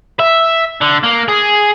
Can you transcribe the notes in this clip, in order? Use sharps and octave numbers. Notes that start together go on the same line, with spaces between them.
E5
D3
A#3
G#4